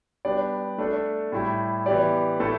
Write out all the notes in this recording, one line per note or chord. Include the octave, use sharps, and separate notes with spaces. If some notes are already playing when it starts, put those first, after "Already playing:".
G3 B3 D4 G4 D5
A3 D4 A4
A2 G3 E4 G4
E3 B3 G4 D5
A2 A3 E4 A4